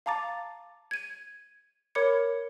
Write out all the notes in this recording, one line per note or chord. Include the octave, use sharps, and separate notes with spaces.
F5 A5 A#5 D6 A6
G#6 D#7
A#4 C#5 B5 D6 G#6 C#7